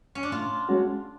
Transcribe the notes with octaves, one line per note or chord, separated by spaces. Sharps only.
C#4
D4
A2 F4
G#3 C#4 F#4